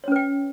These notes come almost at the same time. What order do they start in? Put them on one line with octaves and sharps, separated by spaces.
C#5 C#4 B4 G5